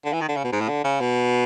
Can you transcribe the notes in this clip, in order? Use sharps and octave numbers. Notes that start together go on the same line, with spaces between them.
D3
E3
D#3
D3
C#3
B2
G#2
A2
D3
C#3
B2